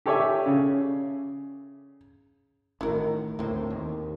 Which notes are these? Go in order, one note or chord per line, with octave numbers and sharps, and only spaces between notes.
G4 A4 C#5 D5 E5 G#5
C#3
A1 A2 D#3 E4 F#4 A#4
D2 A2 A#3 C4
D#2